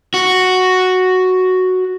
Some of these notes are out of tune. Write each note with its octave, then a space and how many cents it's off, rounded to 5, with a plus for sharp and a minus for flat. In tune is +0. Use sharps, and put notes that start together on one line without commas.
F#4 +0